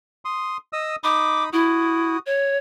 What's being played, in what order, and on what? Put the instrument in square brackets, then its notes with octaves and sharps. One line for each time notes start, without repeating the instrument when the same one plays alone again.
[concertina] C6 D#6
D#5 D#6 E6
[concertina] D#4 B5 D#6 [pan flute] D6
[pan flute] E4 [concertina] F#4 D#6
[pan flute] C#5